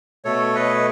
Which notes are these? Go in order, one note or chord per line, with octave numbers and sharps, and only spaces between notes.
B2 A3 A4 C#5
B4 D#5